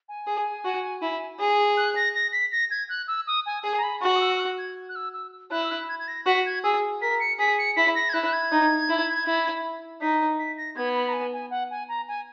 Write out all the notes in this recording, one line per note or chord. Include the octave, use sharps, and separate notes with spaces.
G#5
G#4
F#4
E4
G#4
F#6
A#6
A#6
B6
A#6
G#6
F#6
E6
D#6
G#5
G#4 G#5
A#5
B5
F#4 C#6
D#6
E6
E6
F#6
G#6
F#6
E6
E6
E4 F#6
E6
F#6
G#6
G#6
A#6
F#4 B6
G#6
G#4 E6
A#4 B6
C#7
G#4 B6
C#7
E4 B6
A#6
G#6
E4 F#6
F#6
G#6
D#4
E4
E4
D#4 B6
B6
A#6
B3 G#6
B5
A#5
G#5
G#5
F#5
G#5
A#5
G#5